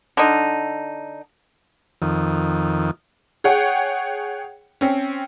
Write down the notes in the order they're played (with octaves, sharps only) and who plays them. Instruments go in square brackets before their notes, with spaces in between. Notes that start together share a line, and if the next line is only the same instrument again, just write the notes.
[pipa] D3 D#4
[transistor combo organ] F2 D#3
[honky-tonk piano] G#4 C#5 F#5 G5
C4 C#4